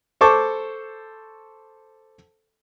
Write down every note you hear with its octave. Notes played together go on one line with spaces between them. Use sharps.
A4 C5 A5 C#6 D6